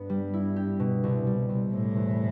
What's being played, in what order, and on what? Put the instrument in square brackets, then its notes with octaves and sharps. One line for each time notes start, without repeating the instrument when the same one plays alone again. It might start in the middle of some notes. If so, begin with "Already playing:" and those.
Already playing: [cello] G2 [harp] B3
[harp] G3
E4
G4
B2
C2
G3
C2
[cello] A2 [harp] C3
[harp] E2